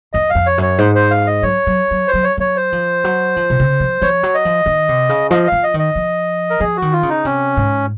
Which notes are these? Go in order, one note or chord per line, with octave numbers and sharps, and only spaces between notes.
F2 D#5
F5
F2
C#5
F#2 C#5
G#2 C5
C5
F5
D#5
F#3 C#5
F#3
F#3
C5
F#3
C#5
F#3 C#5
C5
F3
F#3
F3
C3
C#3
F3
F3 C#5
F#3
D#5
F3
D#3
C3
C#3
F3 D#5
F3 F5
D#5
D#3
D#5
F3
A#4
F3 G#4
F#4
D#3
F4
C#3
D#4
C3 C#4
G#2